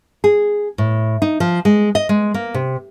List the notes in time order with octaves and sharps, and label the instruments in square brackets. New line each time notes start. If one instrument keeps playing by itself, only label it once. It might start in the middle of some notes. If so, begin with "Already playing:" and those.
[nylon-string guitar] G#4
A2
D#4
F3
G#3
D#5
G#3
A#3
C3